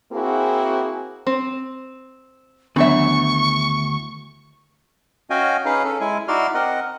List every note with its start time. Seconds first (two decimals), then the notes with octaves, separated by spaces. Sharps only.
0.12 A#3 C4 E4 F#4 G#4
1.27 C4
2.76 D2 D#3 E3 F#3 B3 D4 E5 C#6
5.30 C#4 F#4 D#5 F5 G5 G#5
5.65 C#4 D#4 G#4 B4 F5
5.84 C#4 A4
6.00 G#3 E4 G#5
6.28 D#4 E4 F#4 D5 C6 F6
6.54 C4 A#4 D#5 F#5